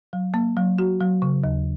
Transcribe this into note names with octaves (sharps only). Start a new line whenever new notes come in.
F#3
A#3
F#3
F#4
F#3
C#3
D#2